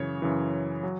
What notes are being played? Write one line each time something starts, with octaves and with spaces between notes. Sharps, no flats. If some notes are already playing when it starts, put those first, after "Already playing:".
Already playing: F#2 C#3 E3 C#5
F#2 C#3 E3
F#3